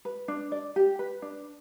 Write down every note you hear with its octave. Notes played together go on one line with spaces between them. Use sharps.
B4
D4
D5
G4
B4
D4